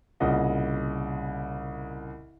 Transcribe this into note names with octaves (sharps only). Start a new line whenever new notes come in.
C2 A#2 C#3 D#5 F#5